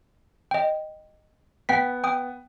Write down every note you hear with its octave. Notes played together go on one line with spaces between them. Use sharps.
D#5 G5
B3 F#5 G5 B6
G5 D#6